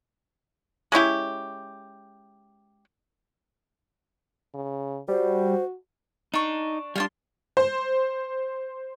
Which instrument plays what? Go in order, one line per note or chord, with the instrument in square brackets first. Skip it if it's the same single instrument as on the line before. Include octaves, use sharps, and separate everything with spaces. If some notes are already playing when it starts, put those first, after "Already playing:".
[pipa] G#3 C#4 E4 G4
[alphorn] C#3
[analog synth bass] G3 [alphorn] F#4 [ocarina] C5
[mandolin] D4 C#6 [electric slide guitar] D#4
[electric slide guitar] G3 D4 [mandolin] F4 G#5 C6
[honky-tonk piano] C5